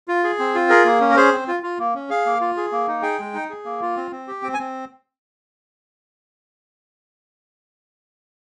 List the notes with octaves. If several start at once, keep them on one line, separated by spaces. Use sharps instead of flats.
F4
G#4
C4
F4
G#4 A#4
A#3
C#4
A#4
G#4 C5
C4
F4
F4
A#3
C#4
G#4 F5
A#3
F4
G#4
A#3
D#4
G#4 G5
G#3
D#4
G#4
A#3
F4
C4
C4
G4
C4 G5
G#5
C4